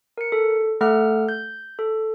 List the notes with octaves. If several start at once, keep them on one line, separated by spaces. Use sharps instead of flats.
A#4 C#7
A4
A3 A4 F#5 F6
G6
A4